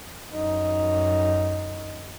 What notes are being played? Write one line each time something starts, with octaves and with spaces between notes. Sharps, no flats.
F#2 D#4